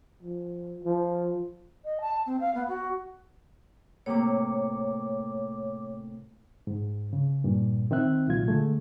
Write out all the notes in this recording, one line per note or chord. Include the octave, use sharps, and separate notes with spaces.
F3
F3
D#5
A5
C4
F5
B3
F#4
A2 C3 A#3 C#5 D6
G#2
C#3
G2 A#2
D#3 C4 D#4 E5 F#6
C2 A#2 F#3 F4 G#6
D3 G#3 A3